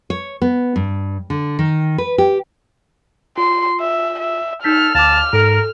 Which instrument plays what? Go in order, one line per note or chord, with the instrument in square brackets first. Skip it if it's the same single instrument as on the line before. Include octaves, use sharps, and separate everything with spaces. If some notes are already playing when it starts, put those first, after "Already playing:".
[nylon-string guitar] C#5
B3
G2
D3
D#3
B4
G4
[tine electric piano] F4 [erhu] C6
[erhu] E5
E5
[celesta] D#4 G6 B6 [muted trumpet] A4 [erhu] F6
[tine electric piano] D2 [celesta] F5 D6 [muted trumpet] A5
[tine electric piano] G#2 [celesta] A4 [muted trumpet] A#4